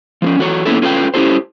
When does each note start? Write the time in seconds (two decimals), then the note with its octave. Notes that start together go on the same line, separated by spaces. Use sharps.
0.22 F3 C4 C#4
0.39 E3 F#4 A4 C#5
0.65 A#3 B3 C#4 E4 A4
0.82 C#4 F4 A4 B4 E5 G5
1.14 C#4 E4 G4 A4 C5